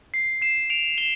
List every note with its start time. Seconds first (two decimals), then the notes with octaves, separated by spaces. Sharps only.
0.14 C7
0.42 C7 E7
0.70 D7 F7
0.98 E7 G7